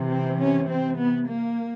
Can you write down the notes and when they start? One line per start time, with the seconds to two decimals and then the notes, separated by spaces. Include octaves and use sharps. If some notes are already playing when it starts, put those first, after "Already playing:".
Already playing: C3 E3
0.10 C4
0.39 C#4
0.68 C4
0.97 B3
1.27 A#3